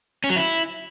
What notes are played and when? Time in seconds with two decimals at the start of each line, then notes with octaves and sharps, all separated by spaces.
0.24 C#4
0.30 F#3
0.36 E4